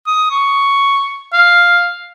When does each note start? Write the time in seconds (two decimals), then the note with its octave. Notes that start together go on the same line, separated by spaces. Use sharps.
0.07 D#6
0.31 C#6
1.33 F5